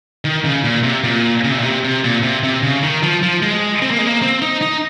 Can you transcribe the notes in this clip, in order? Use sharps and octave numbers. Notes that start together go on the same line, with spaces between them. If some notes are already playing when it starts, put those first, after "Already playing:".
D#3
C#3
A#2
C3
A#2
C#3
C3
A#2
C3
C3
A#2
C3
C3
C#3
D#3
F3
F3
G#3
C4
A#3
G#3
A#3
C4
D#4
D#4